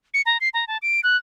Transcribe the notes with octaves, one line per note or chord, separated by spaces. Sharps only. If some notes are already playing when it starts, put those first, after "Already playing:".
C#7
A#5
C7
A#5
A5
D7
F#6